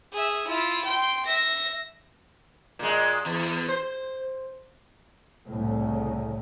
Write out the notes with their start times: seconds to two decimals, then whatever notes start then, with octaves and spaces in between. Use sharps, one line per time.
0.13 G#4 E5
0.47 E4 F4
0.85 G5 C6
1.26 E5 A#6
2.79 A#2 G#3
3.25 E2
3.69 C5
5.48 C2 A2 C#3